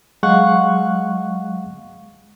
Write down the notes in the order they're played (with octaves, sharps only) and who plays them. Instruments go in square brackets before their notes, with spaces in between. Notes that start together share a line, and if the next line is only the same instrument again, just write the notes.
[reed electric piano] F#3 G#3 F5 F#5 C#6 F#6